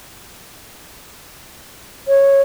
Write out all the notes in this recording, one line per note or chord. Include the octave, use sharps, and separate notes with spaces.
C#5